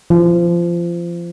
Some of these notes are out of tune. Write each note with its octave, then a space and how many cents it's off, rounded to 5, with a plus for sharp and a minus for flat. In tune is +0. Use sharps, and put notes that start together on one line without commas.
F3 -25